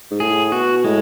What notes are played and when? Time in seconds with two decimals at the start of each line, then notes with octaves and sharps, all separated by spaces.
0.11 G#2
0.20 A2 G#4
0.52 B2 F#4
0.84 A2 G#3